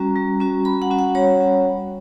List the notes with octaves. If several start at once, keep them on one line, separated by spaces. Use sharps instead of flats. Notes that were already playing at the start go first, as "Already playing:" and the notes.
Already playing: G3 C#4 F#4 A#5
G3
C#4 F#4
G3 B5
F#5
C#4 F#4
F#5
G3 C#5
C#4 F#4
G3